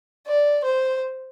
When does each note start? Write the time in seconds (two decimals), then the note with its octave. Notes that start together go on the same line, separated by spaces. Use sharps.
0.27 D5
0.65 C5